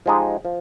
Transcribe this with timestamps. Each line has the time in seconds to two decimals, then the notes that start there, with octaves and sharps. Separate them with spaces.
0.06 F3 G#3 D#4 G4
0.45 F3